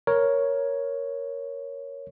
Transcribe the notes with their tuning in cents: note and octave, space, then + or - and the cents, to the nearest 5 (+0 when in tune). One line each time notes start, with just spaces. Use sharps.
A#4 +10 C#5 +0